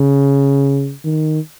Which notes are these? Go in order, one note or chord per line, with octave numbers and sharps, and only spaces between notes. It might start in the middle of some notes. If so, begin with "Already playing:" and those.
Already playing: C#3
D#3